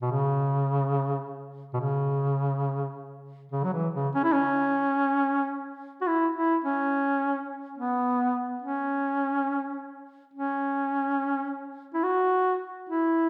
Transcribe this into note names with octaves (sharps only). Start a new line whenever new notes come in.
B2
C#3
B2
C#3
C#3
F#3
E3
C#3
C#4
E4
C#4
F#4
E4
E4
C#4
B3
C#4
C#4
E4
F#4
E4